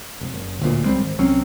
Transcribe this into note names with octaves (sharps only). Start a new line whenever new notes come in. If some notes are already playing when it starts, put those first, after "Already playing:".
F1
F#1
D1 D2 A#2
C#2 G3 C4
G#1
C2 F#3 C4 C#4